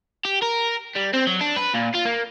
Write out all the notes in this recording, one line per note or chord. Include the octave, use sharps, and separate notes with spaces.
G4
A#4
G3
C4
F#3
D4
B4
A#2
F4
A#3